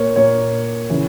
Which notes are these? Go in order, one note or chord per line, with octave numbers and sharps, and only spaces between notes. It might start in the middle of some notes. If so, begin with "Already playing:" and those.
Already playing: A#2 A#3 A#4 C#5
A#2 A#3 C#5
C#3 E3